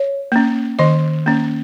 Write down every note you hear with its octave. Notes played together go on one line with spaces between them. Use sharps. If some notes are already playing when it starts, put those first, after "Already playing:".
Already playing: C#5
A#3 C#4
D#3 D#5
A#3 C#4